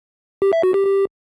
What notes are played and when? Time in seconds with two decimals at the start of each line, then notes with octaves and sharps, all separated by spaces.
0.42 G4
0.53 E5
0.63 F#4
0.74 G4
0.85 G4